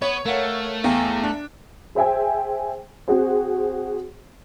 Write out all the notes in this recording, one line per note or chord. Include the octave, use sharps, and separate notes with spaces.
B3 C#5
A3 A#4 F5 F#5
E2 F5 G5 G#5
D4
G#4 C5 E5 G5 G#5
C4 F#4 G#4 C5